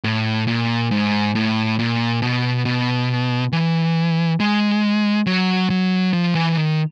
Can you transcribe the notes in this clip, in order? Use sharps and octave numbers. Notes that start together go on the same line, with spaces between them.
A2
A#2
G#2
A2
A#2
B2
B2
E3
G#3
F#3
F#3
F3
E3
D#3